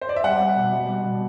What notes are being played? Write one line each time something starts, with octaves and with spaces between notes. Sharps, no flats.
C5
D5
E5
G3 F#5
G3
B2
G3
G3
B2